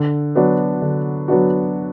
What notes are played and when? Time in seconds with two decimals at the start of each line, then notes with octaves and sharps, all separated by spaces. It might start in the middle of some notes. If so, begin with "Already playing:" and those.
Already playing: D3
0.35 F#3 B3 D4 F#4
0.82 D3
1.28 F#3 B3 D4 F#4